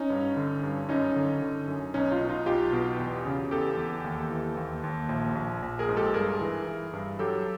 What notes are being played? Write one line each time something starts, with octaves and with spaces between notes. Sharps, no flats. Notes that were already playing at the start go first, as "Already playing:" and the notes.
Already playing: C#4 D#4
G2
D3
G2
F#2 C#4 D#4
D3
D3
F#2
B1 C#4 D#4
D#4 F4
B2
D#4 F4
B1 F4 G4
B2
E2
C#3
E2 G4 A4
E2
D#2
E3
D#2
D#2
A#1
A#1
A#1
G#4 A#4
G#2
G4 A4
G2 G#4 A#4
E3
E3
G2
F#3 G4 A4